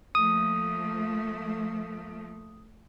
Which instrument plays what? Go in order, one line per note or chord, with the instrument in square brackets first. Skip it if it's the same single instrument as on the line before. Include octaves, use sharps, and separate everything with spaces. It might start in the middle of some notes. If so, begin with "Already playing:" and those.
[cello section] F3 A3 A#3 [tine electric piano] D#6